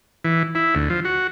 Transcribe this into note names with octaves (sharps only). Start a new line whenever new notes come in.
E3
E4
D2
F3
F#4